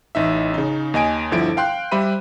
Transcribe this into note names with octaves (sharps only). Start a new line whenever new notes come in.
A1 D#4 E5
C#3 D#4
D#2 D#5 G#5 D7
G1 D3 F3 E4 D7
F5 G5 C6 F#6
G3 G4 C5 E5 B5 D#7